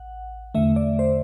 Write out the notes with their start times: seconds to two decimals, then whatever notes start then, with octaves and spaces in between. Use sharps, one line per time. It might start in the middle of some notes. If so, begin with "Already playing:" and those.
Already playing: A1 F#5
0.55 E2 D3 A3 E5
0.76 D5
0.99 C5